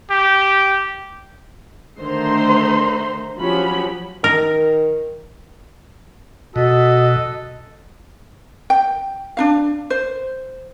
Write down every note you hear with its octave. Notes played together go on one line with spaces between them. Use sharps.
G4
D3 D#3 A3 C5 A#5 C6
F3 F#3 C#4 F#4 G4 B5
D#3 A#4
B2 F#4 A4 D#5
G5
D4 D#4 F5
C5